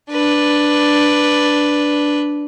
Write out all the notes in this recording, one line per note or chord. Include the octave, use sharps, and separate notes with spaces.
D4 B4